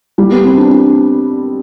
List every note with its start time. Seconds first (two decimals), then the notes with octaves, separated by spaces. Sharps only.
0.18 G3
0.32 B3
0.44 C4
0.57 D4
0.70 D4